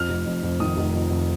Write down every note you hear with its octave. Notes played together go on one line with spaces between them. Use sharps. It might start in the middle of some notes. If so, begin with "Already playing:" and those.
Already playing: F2 F6
F1
F2
F2
D#3 D#6
F1
F2
F2